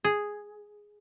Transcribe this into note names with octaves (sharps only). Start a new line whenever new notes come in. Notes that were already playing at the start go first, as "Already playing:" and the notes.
G#4